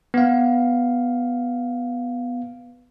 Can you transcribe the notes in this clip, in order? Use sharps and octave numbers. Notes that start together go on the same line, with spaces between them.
B3 F5